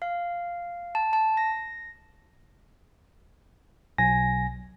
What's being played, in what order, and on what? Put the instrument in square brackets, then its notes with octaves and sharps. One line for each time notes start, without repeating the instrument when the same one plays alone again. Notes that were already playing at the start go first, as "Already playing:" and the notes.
[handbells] F5
A5
A5
A#6
[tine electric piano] B1 G#5 A#6